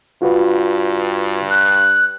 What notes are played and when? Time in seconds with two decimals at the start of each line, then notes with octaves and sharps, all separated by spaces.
0.22 G2 F4 F#4 B4
1.50 F#6